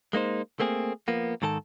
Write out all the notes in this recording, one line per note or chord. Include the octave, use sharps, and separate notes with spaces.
G#3 A#3 D#4 C5
A3 A#3 C4 G#4
F3 A#3 B3
G#2 D#3 A4 B4 A5